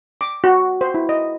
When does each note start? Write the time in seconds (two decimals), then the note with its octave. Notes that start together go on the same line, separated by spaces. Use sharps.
0.21 D6
0.44 F#4
0.81 C5
0.94 E4
1.09 D#5